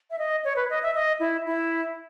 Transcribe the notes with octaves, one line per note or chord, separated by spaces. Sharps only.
E5
D#5
C#5
B4
D#5
E5
D#5
E4
E4